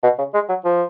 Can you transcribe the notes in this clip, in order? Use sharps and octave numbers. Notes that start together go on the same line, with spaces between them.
B2
C#3
G#3
F#3
F3